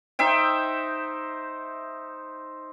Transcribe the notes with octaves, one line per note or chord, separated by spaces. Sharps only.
D#4 C5 E5 G5